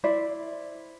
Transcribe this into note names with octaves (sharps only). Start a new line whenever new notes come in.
E4 C5 D5